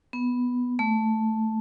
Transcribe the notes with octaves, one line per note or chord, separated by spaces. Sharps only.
B3
A3